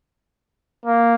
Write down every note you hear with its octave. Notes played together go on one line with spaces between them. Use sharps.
A#3